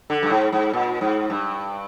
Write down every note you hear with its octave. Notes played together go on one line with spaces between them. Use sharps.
D3
G2
G#2
G#2
A#2
G#2
G2